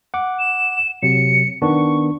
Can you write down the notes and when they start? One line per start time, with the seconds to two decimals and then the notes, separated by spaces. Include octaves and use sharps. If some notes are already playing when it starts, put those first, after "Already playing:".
0.14 F#5 D6
0.39 E7
1.03 C3 F#3 C#7
1.62 D#3 B3 D4 C#6